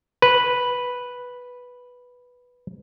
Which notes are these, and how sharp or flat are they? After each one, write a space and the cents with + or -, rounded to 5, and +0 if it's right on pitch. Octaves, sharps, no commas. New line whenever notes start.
B4 -5